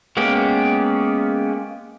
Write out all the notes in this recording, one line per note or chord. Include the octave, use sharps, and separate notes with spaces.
G#3 A#3 B3 C#4 G4